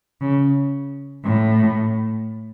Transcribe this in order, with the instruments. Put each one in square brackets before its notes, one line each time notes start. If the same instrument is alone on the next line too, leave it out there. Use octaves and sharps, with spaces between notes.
[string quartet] C#3
A2